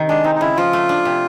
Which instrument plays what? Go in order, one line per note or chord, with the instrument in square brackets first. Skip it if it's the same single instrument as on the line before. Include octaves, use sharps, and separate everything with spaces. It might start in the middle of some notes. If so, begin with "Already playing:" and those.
Already playing: [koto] C3 D#3
[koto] G#3 [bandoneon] D4
[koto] C4 [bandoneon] D#4
[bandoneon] D#4
[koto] C#3 [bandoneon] E4
[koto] F3 [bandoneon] F4
[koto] A3
D4
C3